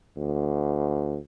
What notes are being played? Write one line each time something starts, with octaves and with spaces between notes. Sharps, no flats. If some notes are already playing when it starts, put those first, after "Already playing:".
D2